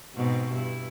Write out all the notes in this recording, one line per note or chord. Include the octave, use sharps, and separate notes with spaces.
G#2 B2 C4
G2 E4